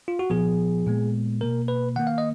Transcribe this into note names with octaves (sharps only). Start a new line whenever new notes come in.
F4
F#4
A#2 F3 B3 G#4
A#2 G#3 B3
B2 A#3 A#4
B4
D#3 A#3 F#5
F5
D#5